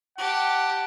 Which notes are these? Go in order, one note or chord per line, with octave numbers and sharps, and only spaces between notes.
G4 F#5 A5